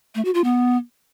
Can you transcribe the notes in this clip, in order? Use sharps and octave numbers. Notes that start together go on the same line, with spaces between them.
A3
F#4
F4
B3